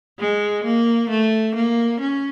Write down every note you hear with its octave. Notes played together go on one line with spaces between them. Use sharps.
G#3
A#3
A3
A#3
C#4